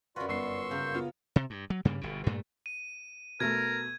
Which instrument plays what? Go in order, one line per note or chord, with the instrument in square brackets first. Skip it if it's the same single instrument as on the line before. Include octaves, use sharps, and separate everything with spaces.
[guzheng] F#2 B4 [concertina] F4 F#4 [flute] D5
[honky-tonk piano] G1 C7 [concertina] C6 C#6 E6
[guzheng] C#3 A#3 E5 [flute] G6
[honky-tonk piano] B3 F4
[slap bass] C3
G2
F#3
G2 C#3 G3 A#3
G1 B2
G2 A#2 A3
[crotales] D#7
[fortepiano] B2 A3 [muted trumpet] A#4 [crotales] G#6